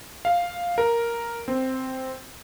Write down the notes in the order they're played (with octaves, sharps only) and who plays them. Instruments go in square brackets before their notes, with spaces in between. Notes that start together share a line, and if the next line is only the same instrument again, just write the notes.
[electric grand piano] F5
A#4
C4